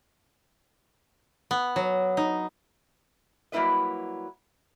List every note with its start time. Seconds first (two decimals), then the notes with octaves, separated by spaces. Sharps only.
1.51 B3
1.76 F#3
2.17 D#4
3.52 F#3 G3 A#3 E4 B4 D#5